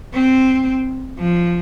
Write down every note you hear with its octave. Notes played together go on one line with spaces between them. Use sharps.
C4
F3